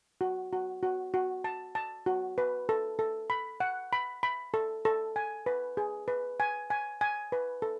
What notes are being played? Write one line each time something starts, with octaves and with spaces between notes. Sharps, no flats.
F#4
F#4
F#4
F#4
A5
A5
F#4
B4
A4
A4
B5
F#5
B5
B5
A4
A4
G#5
B4
G#4
B4
G#5
G#5
G#5
B4
A4